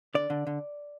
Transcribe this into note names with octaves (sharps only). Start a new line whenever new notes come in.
D3 D5
D3
D3